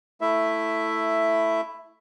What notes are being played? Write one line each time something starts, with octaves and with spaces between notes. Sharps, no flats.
A3 E4 E5